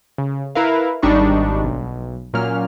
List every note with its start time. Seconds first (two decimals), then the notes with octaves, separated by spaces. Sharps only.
0.18 C#3
0.55 E4 A#4 B4 F5
1.03 G#1 G3 D4 D#4 B5 C#6
1.64 B1
2.34 A#2 F#3 A#3 C#4 F6